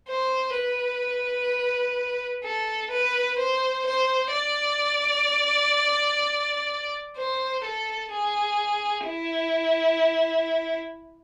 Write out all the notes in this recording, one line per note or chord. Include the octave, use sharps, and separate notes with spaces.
C5
B4
A4
B4
C5
C5
D5
C5
A4
G#4
E4